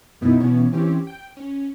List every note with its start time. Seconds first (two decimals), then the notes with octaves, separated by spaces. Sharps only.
0.21 F#2 B2 E3 B3 D#4 E4
0.40 B2 E3 B3 C#4
0.72 E3 C4 C#4 G4
1.07 G5
1.37 C#4